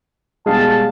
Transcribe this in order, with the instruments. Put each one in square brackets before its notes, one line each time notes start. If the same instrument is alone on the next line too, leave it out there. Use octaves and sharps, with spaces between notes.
[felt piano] B2 G3 [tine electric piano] G#3 G#4 F5 [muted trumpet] A5